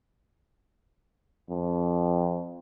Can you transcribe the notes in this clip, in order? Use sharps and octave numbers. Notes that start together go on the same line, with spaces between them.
F2